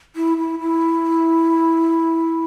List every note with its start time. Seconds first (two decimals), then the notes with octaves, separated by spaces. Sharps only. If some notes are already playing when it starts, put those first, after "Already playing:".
0.16 E4
0.37 E4
0.60 E4